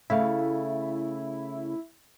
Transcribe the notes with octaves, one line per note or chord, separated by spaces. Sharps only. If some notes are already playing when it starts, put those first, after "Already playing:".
C#3 A3 E4 F5